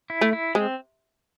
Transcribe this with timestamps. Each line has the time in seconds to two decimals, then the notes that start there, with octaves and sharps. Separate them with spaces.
0.10 E4
0.21 A3
0.33 E4
0.55 G#3 C4